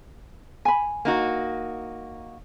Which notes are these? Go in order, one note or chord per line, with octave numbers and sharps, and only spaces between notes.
G#5 B5
A#3 D#4 F#4